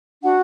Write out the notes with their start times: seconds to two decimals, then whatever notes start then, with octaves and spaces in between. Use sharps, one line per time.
0.23 D4 F#4 F#5